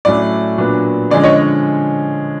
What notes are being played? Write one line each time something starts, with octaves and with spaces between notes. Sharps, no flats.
A2 F#3 A3 C#4 D5
A#2 F#3 B3 D4
D3 F3 G#3 C#4 D5
C#5 D#5